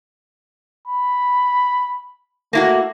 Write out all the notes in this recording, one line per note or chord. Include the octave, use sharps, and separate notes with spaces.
B5
A3 A#3 E4 F#4